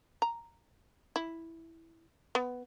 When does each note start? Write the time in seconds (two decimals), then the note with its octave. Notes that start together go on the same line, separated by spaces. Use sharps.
0.22 A#5
1.16 E4
2.35 B3